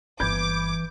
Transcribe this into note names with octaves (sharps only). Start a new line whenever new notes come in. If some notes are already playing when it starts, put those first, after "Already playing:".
G1 E3 A#3 B5 D6 G6 G#6